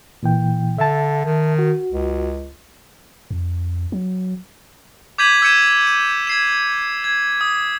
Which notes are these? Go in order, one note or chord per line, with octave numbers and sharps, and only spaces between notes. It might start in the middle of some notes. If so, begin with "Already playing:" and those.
A#2 E3 G5
D3 E5 A5
D#3
F#4
C#2
F2
F#3
D6 G6 G#6 B6 D#7 F#7
E6 G6 G#6 C#7 D#7 E7
D#7
G#6 C7 E7
G#6
D#6